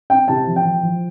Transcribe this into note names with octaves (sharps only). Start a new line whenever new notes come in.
C4 G5
C3 A5
F3
G5
F3
F3